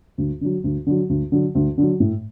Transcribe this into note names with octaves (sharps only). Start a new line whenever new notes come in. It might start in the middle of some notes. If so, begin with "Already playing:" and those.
D2
D3 F#3
D2
D3 F#3
D2
D3 F#3
D2
D3 F#3
A2